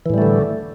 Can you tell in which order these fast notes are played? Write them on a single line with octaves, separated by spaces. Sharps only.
E3 A2 G3 A3 D3